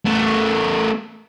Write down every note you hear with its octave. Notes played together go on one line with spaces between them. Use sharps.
A3 B3